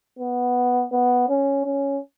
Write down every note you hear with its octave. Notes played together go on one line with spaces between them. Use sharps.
B3
B3
C#4
C#4